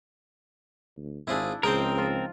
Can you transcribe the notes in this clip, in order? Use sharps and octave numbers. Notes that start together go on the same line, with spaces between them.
D2
G#1 C4 D4 E4 F4 G#4
C#2 F3 C4 D#4 G#4 A#4 G5 C6
F3 F4